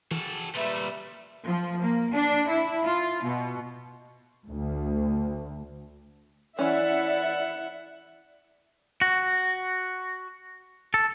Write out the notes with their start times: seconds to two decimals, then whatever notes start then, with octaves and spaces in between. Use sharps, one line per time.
0.11 E3 F#4 G#4 A4
0.54 A#2 G3 A3 B4 E5
1.47 F3
1.80 A#3
2.14 D4
2.50 E4
2.85 F4
3.24 B2
4.48 D2
6.59 E3 C#4 E4 D5 E5 F#5
9.01 F#4
10.94 A4